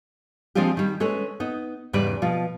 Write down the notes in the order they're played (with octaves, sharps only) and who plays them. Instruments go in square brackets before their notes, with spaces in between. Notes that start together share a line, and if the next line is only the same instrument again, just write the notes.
[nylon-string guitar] F3 G#3 C4 D4 F4 G4
D#3 G3
G#3 C#4 A4 B4 C#5
B3 D#4
E2 G#2 C#3 G3 B4 D5
B2 F3 F4